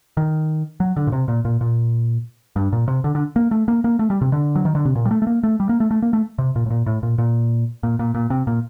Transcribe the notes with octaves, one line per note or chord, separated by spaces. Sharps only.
D#3
F#3
D3
A#2
C3
A#2
A#2
A#2
G2
A#2
C3
D3
D3
A#3
A3
A#3
A#3
A3
G3
C3
D3
F#3
D#3
D3
C3
A#2
G3
A3
A3
A#3
A3
G3
A#3
A3
A3
A#3
A3
C3
A#2
A2
A#2
A2
A#2
A#2
A#2
A#2
A#2
C3
A#2